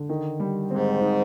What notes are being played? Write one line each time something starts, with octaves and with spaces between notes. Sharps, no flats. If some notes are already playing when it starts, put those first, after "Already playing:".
Already playing: D3
D#3
G3
G#2 C4
D#4